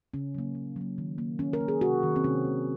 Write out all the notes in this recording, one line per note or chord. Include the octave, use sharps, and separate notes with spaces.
C#3 C#4
F#3 A#3
C#3
F#3 A#3
D#3
A#3
D#3 C#4
A#4
A#3
G#4
C3 F#4
D#3 A#3
C4
C3 C#4
D#3 A#3